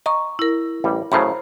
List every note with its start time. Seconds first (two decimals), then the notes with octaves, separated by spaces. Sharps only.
0.06 D#5 A#5 C#6
0.39 E4 A#4
0.84 A1 G3
1.12 F#2 A2 C#3 C5 A#5 B5